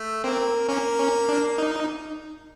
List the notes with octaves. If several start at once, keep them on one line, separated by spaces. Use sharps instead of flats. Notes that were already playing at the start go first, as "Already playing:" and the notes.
Already playing: A3
A#3 C4
A#3 C#4
C#4
D4
D#4